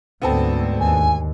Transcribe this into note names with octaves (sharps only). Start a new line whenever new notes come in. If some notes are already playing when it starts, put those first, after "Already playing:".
D2 G#2 B3 C4 A4
D#2 G#5